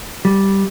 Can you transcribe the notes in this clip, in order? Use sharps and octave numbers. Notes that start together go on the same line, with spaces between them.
G3